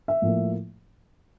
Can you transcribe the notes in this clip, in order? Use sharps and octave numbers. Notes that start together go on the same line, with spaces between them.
E5
A2 F3 A#3